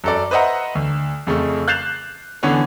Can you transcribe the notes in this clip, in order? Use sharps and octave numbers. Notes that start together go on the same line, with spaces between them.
F#2 A4 D5
B4 C5 D#5 E5 F#5 A#5
D2
F2 C#3 A3
F#6 G6 A6 C7 E7 F7
D3 E3 B3 C#4 D4